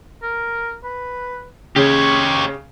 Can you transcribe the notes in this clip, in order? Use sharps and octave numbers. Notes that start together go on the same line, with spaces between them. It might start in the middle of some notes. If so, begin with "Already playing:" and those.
A#4
B4
C#3 G4 C#5 C#6